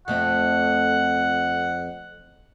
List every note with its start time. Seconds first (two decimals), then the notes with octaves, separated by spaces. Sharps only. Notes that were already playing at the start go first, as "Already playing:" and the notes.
0.08 F2 A3 C4 F#5